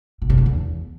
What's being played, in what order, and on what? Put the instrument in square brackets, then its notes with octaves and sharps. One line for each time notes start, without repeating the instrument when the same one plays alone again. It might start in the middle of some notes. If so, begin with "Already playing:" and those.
[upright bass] B2
C#3
D3
E2